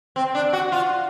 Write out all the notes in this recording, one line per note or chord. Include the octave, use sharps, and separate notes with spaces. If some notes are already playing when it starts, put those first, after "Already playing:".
C4
D4
F#4
F4